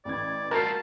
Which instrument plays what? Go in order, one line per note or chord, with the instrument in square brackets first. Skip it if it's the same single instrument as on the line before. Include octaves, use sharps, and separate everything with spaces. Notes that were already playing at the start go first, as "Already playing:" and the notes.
[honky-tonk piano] A1 E3 G#6 [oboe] D5
[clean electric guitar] G3 A3 F4 [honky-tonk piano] F#4 F6 [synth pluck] A#4 [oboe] A5